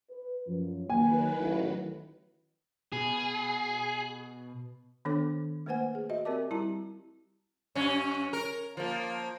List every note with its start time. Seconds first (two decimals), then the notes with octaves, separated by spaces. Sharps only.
0.10 B4
0.47 F#2 F3
0.90 D#3 F#3 A#3 B4 G#5
1.39 A1
2.92 B2 G#4
5.05 D#3 B3 D4 A4 C#5 D6
5.66 A3 A#3 B4 C5 F#5 G#5
5.95 G#4
6.09 F#4 D#5 E5
6.25 C4 G4 A#4 D5 A5 D6
6.51 G3 E4 G4 A5 A#5
7.75 F#2 C#4
8.33 A#4
8.77 F3 A#3